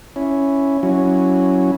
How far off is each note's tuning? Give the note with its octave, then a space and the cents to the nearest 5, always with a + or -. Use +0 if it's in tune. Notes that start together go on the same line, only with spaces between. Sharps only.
C#4 +0 E4 +0
F#3 -10 C#4 +0 E4 -15